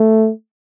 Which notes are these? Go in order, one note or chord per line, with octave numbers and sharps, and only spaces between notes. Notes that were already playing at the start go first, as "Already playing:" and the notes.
Already playing: A3